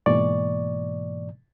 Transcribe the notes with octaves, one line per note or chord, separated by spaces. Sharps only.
G#2 B2 E3 A#3 D5 C#6